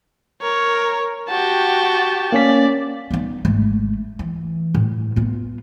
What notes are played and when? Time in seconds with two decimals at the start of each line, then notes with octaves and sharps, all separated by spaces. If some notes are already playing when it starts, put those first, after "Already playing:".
0.42 A#4 C#5
1.29 F#4 G4 G5 A5
2.32 A#3 C#4 D5 B6
3.11 B3 D#4
3.45 G#1 A3
4.19 E3
4.75 A2
5.16 B3 F4